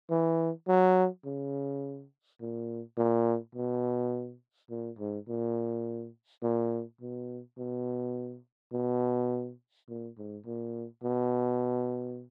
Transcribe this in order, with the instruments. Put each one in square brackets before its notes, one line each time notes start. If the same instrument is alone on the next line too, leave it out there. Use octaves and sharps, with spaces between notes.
[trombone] E3
F#3
C#3
A#2
A#2
B2
A#2
G#2
A#2
A#2
B2
B2
B2
A#2
G#2
A#2
B2